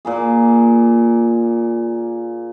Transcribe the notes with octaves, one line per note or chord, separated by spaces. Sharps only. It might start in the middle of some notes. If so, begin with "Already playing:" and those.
A#2 A#3 G#4